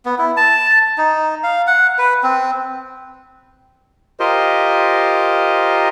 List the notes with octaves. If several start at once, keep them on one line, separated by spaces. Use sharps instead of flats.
B3
E4
A5
D#4
F5
F#5
B4
C4
F4 G4 A#4 C5 D#5